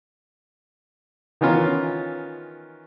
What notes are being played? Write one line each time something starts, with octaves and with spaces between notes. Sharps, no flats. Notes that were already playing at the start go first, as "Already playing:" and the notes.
D#3 E3 B3 C#4 F4 A#4